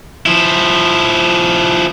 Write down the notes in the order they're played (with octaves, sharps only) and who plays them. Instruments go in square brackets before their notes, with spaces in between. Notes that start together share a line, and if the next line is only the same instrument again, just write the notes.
[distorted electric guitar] F3 E4